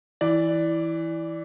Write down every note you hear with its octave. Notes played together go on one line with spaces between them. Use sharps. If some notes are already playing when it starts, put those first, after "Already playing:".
E3 D5